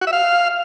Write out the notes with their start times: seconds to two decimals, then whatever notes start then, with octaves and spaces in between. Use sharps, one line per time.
0.01 F#4
0.07 E5
0.13 F5